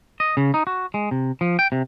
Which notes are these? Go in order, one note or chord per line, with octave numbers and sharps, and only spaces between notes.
D#5
C#3
D#4
F#4
G#3
C3
F3
G5
C3